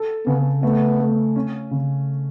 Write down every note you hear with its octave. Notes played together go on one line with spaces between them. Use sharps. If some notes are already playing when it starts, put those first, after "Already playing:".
Already playing: A4
C#3 B3
A3 B3
A3
C#4
C#3